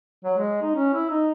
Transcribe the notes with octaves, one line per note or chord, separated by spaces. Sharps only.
F#3
G#3
D#4
C#4
E4
D#4